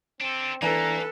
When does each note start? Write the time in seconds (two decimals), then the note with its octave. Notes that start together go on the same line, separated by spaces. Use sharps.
0.20 C4 D4 A4
0.62 E3 A#3 D4 A4 B4 A#5 D#7